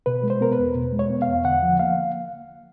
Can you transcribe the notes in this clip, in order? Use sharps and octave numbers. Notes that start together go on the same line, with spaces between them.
B2 B4
G#3
C5
B3 A#4
B4
E2
B2
G#3
C#5
B3
F5
E2
D3 F#5
F3
A#3 F5